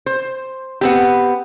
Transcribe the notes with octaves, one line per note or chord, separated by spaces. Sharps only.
C5
B3 C4 G4